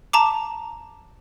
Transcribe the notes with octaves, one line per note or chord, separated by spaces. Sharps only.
A5 A#5 D6